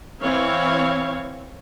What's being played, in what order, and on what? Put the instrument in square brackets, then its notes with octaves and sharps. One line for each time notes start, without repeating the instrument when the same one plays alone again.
[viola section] E3 C4 C#5 F5